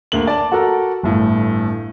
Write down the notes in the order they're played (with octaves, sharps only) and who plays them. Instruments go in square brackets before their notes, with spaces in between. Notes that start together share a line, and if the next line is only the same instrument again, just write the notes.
[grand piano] D2 A#3 F#7
D5 A5
F#4 A4 A#4
G1 A2